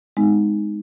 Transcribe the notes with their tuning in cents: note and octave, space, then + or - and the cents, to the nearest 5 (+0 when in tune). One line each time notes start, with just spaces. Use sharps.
G#3 +0 B3 +45 D#4 +0